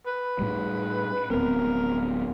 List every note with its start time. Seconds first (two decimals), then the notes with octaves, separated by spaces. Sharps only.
0.06 B4
0.39 A2 G3
1.30 D1 B3 C4 A#4